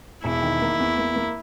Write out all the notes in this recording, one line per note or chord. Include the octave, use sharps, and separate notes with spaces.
E1 E4
D#3
A#3
E2
A#3
A#3